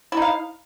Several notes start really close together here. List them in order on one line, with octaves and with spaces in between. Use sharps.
E4 D#4 F5